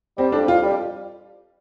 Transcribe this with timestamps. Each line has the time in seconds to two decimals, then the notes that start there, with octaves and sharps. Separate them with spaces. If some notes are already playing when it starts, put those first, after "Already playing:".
0.18 G3 C4
0.32 F2 D4
0.48 F2 F4
0.63 G3